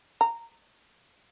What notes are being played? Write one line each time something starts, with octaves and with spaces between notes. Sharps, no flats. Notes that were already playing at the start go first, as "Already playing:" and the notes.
A#5